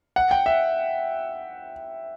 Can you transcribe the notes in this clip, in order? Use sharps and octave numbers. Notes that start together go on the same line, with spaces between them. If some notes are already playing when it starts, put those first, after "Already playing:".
F#5
G5
E5